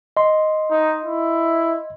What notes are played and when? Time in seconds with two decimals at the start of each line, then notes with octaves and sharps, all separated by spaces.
0.17 D#5 C6
0.71 D#4
1.04 E4